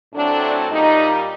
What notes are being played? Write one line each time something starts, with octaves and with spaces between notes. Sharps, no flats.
A2 F#3 A3 C4 D4
A#2 G3 A#3 D#4